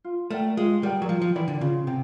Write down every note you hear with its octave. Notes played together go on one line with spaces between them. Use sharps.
F4
A3 A#4 D5 G5
G#3 F4
G3 A#4 D5 G5
F#3
F3 F4
F3
E3 A#4 D5 G5
D3
C#3 F4
C3 G5